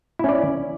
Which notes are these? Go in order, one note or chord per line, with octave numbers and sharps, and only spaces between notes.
C#4 E4 D5